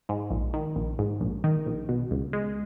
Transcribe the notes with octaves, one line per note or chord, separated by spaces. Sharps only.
G#2
A#1
D#3
A#1
G#2
A#1
D#3
A#1
B2
C#2
G#3